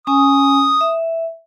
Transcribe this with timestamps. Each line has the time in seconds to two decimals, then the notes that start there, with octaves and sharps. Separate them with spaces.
0.07 C#4 G#5 D#6
0.81 E5